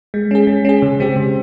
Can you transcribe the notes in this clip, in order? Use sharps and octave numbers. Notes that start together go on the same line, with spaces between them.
G#3
C#4 G#4
G#3
C#4 G#4
C#3
G#3 C4 G4
C#3